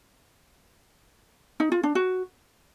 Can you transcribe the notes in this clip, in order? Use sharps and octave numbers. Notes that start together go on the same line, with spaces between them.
D#4
F4
D4
F#4